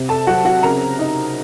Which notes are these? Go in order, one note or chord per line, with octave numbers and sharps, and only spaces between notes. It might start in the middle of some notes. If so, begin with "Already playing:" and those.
Already playing: C3
A4 A5
F#3 F#4 F#5
F#4 F#5
C#3 A#4 A#5
D#4